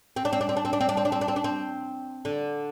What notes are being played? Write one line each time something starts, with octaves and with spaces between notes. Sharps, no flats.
C4
D4
C4
D4
C4
D4
C4
D4
C4
D4
C4
D4
C4
D4
C4
D4
C4
D3